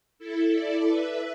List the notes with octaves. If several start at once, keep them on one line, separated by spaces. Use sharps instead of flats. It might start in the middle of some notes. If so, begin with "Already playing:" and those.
E4 A4
A4 D5
B4 E5